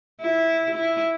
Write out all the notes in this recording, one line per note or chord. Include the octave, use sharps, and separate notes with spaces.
E4
E4